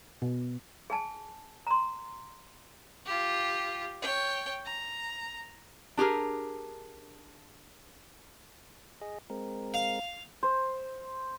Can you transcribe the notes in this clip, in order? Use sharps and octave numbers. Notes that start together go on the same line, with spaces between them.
B2
G#4 G#5 A5
A#5 C6
F4 G4
C#5 G5
A#5
D4 G4 G#4 A#4
G#4 D#5
G#3 C4 A#4
F5
C5